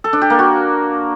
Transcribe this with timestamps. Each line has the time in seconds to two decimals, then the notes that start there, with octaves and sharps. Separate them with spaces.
0.04 A4
0.13 D4
0.22 G4
0.30 A#3
0.39 F#4